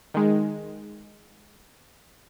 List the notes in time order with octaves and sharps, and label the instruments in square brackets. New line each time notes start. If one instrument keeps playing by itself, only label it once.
[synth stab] D#3 G#3